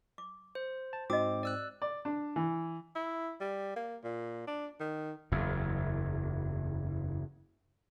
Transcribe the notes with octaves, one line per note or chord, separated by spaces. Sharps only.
D6
C5
A5
G#2 C4 F#4 D#5 D6
D5 E6 F#6
D5
D4
E3
E4
G3
A#3
A#2
D4
D#3
F#1 E2